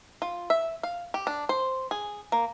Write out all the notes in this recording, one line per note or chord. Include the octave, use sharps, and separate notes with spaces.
F4
E5
F5
G4
D4
C5
G#4
A#3